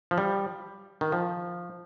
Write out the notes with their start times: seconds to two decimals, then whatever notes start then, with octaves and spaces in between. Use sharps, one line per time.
0.11 F3
0.18 G3
1.01 D#3
1.12 F3